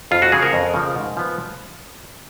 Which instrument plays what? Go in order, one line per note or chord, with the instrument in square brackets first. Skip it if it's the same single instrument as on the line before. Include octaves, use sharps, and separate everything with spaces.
[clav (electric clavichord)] F2 F4
F#4
C#3 F3 G#4
A#4
F2
C#3 F3
G#2
F3 B3